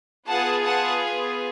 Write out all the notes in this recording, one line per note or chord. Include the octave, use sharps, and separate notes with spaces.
B3 F4 G#4 F#5 A5
F#5 A5